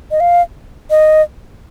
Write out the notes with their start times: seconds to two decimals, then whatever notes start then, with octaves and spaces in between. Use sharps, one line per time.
0.11 D#5
0.20 F5
0.90 D#5